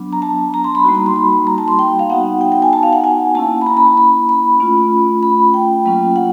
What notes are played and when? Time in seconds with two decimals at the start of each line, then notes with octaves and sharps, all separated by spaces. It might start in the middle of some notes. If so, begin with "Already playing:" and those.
Already playing: F#3 B3 D4
0.12 A#5
0.22 A5
0.54 A#5
0.64 C6
0.75 B5
0.85 G3 A#3 D#4 F#4
0.95 A#5
1.06 C6
1.16 B5
1.47 A#5
1.58 A5
1.68 C6
1.79 G5
1.99 F5
2.10 B3 D#4 F#4 F#5
2.41 G5
2.52 G5
2.62 G#5
2.73 A5
2.83 F5
2.93 F#5
3.04 G#5
3.35 A#3 C#4 E4 A5
3.61 B5
3.66 A#5
3.77 B5
3.87 B5
3.97 B5
4.29 B5
4.60 A3 C#4 F4
5.23 B5
5.54 G5
5.85 F#3 A#3 C#4 F4
6.16 F#5